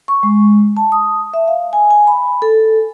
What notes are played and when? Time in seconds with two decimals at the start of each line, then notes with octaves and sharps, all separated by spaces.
0.08 C#6
0.23 G#3
0.77 A5
0.92 D#6
1.34 E5
1.48 F5
1.73 G#5
1.91 G#5
2.07 B5
2.42 A4